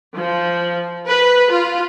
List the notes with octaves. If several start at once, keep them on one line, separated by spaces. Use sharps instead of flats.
F3
B4
F4